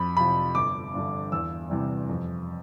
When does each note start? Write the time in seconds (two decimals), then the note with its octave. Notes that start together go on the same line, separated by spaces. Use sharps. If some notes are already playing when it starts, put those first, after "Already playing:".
Already playing: F2 B5
0.17 C3 F3 B5
0.55 G1 D6
0.94 G2 D3
1.32 E2 E6
1.70 C3 E3 G3
2.09 F2